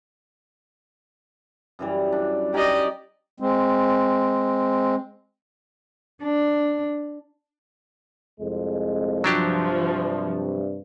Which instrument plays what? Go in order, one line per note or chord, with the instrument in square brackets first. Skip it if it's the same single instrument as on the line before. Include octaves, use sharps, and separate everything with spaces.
[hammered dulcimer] F#2 E3 G3
D4
[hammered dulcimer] C#4 D#4 G5 [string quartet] G4 D5 D#5
[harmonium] G#3 C4
[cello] D4
[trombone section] C2 F2 G#3
[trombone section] G2 C3 [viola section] F3 [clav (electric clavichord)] F#3 D4 G4